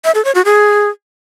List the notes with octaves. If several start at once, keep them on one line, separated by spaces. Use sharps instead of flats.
E5
A4
C#5
F#4
G#4